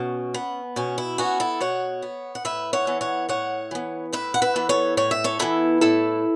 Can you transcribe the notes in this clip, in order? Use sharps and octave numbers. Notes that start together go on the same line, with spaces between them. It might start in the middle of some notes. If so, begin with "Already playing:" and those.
Already playing: B2 C#4
B3
B2 C#4
E4
B3 C#4 F#4
E4 A4
B2 C#5 F#5
B3
F#5
A2 B4 E5
C#5 F#5
E3 B3
C#5 F#5
A2 C#5 F#5
E3 B3
A2 B4 E5
F#5
B4 E5
E3 B3
A4 C#5
A2 C#5
E5
A4 C#5
E3 B3 E4 A4
A2 E4 A4